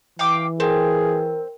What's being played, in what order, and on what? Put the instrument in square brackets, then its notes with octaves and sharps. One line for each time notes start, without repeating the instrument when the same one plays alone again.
[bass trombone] E3 [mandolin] F5 G5 D6
[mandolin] C4 [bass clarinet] G#4 [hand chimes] A#4 G5